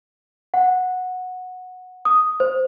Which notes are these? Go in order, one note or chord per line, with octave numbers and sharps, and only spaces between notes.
F#5
D#6
C5